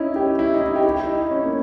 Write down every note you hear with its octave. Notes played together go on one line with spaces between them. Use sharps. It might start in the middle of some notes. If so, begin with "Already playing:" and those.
Already playing: C#4 D#4 E4
G4
E4
D#4
E4
G4
E4
D#4
C#4
A#3